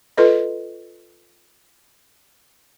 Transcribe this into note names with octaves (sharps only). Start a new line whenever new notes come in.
F4 A4 B4 D#5